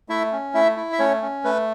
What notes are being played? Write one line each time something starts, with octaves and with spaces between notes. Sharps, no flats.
A3 E4 E5
C#4
A3 E4 E5
E4
E5
A3 C#4 C#5
C#4
A3 B4